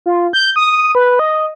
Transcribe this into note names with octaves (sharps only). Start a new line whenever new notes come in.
F4
G6
D#6
B4
D#5